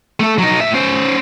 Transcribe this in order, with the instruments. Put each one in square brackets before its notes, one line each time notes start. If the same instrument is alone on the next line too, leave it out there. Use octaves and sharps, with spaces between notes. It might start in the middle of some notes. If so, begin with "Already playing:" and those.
[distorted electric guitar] A3 A4
F#3 D#4
A2 E5
C#4 C5